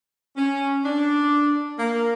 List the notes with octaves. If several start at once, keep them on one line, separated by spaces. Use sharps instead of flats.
C#4
D4
A#3